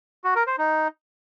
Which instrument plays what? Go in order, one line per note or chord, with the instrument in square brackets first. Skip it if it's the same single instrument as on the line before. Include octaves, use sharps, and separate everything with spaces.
[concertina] F#4
A#4
C5
D#4